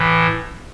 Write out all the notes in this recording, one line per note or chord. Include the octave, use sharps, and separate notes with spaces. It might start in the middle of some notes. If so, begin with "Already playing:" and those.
Already playing: A2 E3